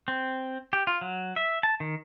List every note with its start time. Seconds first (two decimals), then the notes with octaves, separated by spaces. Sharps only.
0.08 C4
0.73 G4
0.87 F4
1.01 F#3
1.36 E5
1.63 A5
1.80 D#3